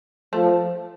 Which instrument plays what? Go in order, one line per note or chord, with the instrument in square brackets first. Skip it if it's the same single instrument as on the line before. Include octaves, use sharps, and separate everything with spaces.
[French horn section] F3 [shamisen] A3